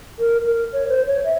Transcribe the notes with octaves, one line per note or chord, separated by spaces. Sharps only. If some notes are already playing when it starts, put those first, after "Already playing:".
A#4
A#4
C#5
C5
C#5
E5